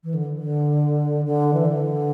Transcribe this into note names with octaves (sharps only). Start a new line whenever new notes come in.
E3
D3
D3
D3
E3
D3